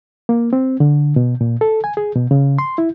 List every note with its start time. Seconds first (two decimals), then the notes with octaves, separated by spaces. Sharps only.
0.29 A#3
0.53 C4
0.80 D3
1.16 B2
1.41 A#2
1.61 A4
1.84 G#5
1.97 G#4
2.15 B2
2.31 C#3
2.59 C6
2.78 E4